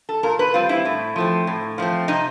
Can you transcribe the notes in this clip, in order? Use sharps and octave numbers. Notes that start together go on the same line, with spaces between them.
A4
A#2 A#4
B4
G3 C4 F4
E4
A2
F3 A3 C4
A2
F3 A3 C4
C3 D#4